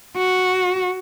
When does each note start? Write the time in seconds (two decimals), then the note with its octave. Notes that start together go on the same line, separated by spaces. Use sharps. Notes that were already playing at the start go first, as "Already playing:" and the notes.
0.17 F#4